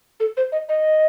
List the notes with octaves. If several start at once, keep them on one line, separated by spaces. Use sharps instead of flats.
A4
C5
D#5
D#5